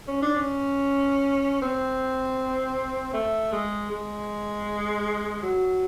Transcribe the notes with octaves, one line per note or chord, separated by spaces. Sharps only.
C#4
D4
C#4
C4
A3
G#3
G#3
F#3